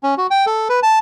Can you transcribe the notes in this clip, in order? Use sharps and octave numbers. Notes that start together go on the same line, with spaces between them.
C#4
F#4
G5
A4
B4
A5